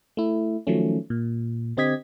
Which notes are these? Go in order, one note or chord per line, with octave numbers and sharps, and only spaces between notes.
A3 E4
D#3 F3 F#3 A3 C#4
A#2
D3 C4 G4 D#5 G#6 B6